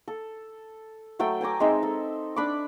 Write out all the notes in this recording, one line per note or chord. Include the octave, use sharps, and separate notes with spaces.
A4
F#3 A3 A4 G5
G5 G#5 A#5 D6
G#3 C4 D#4 E5
A4
D4 B5 C#6 D6